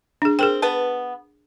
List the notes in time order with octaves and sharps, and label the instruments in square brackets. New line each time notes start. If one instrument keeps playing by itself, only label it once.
[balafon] D4 G#4
[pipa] C4 [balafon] G#4 A#4 G5
[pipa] B3 B4 A5